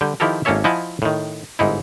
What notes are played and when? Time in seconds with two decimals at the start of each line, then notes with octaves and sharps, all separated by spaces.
0.01 D3 G3 G5
0.20 D#3 F3 E4 G4 A4 A#4
0.45 G#1 A#3 C#4 A4 C#5 E5
0.64 F3 E4 D#5 F#5 G#5 A5
1.02 A2 D#3
1.59 G1 G#2 D#4 E4